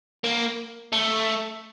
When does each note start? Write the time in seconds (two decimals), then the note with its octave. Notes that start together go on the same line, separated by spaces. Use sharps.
0.24 A#3
0.92 A3